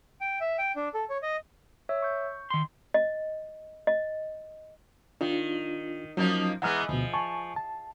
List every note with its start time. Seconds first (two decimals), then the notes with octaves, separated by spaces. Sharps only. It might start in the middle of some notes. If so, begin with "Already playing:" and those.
0.21 G5
0.41 E5
0.59 G5
0.76 D4
0.94 A4
1.10 C#5
1.23 D#5
1.89 C#5 E5 E6
2.02 C#6 G6
2.50 D#3 C6
2.94 D#5
3.87 D#5
5.21 D#3 D4 F4
6.17 F3 F#3 A#3 C#4 D#4
6.62 E3 G#3 B3 F#5 A#5 F6
6.89 D2 B2 F3
7.14 G#5 A5 C#6
7.56 A5